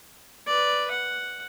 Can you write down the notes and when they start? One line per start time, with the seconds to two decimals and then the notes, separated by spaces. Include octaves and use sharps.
0.47 B4 D5
0.91 F#5